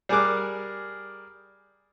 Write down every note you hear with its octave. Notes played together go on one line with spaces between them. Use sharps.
G3 G#4 A#4 D6 F#6